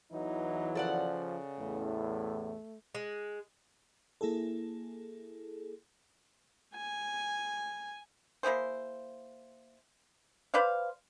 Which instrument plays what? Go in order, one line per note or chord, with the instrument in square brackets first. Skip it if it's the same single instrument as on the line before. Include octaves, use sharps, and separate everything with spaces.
[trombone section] E2 E3 F#3 [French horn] D#4
[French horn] C#3 [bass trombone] F3 [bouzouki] A4 D5 F#5
[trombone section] A1 E2 A2 [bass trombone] A3
[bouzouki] G#3
[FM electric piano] A#3 E4 G#4 A4
[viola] G#5
[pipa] A#3 E4 G#4 C5
B4 C5 D5 F5